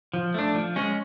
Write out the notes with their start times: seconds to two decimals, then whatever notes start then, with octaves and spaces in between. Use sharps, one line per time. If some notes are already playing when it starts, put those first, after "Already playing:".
0.14 F3
0.34 A3 D4
0.55 F3
0.76 G#3 C#4